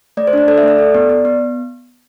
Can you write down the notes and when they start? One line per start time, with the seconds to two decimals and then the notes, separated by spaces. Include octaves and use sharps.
0.17 A3 D5
0.27 C5
0.33 D4 D5
0.48 A4 D5
0.58 E5
0.63 A3 D5
0.79 A4
0.95 B3
1.09 B3
1.25 B3